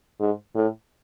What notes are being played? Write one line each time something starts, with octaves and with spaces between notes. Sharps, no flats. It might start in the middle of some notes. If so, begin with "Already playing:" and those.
G#2
A2